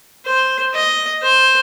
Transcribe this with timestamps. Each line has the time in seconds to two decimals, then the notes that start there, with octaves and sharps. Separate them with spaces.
0.26 C5
0.74 D#5
1.23 C5